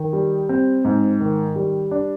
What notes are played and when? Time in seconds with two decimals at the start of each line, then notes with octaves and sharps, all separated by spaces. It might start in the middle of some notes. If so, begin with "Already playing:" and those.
Already playing: D#3
0.13 G3
0.49 C4
0.85 G#2
1.20 D#3
1.56 G3
1.91 D4